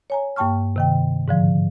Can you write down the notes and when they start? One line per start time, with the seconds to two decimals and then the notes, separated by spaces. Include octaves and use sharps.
0.10 C#5 G#5 A#5
0.36 G2 A#3 G5 A5 C#6 F6
0.76 C3 D#3 G5
1.28 G#2 D3 F3